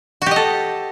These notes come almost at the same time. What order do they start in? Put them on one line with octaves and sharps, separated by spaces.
F#4 G4 D#5 A4